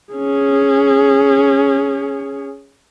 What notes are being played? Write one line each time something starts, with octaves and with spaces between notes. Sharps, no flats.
C#4 G#4